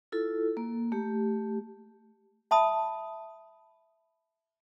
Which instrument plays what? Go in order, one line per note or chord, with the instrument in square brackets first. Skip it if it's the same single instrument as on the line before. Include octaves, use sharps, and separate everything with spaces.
[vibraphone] E4 F4 A4
A#3
A3 G4
[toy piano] E5 A5 B5 D#6